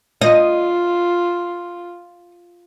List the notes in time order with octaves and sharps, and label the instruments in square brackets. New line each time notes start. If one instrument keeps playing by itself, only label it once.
[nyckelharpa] F4 [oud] D#5